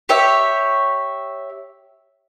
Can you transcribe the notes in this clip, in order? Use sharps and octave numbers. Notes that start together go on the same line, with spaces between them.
G4 C#5 E5